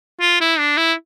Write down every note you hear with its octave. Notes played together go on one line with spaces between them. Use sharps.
F4
E4
D4
E4